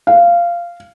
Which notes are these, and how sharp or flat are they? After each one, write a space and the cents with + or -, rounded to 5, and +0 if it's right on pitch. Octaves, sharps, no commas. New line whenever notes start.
F5 -15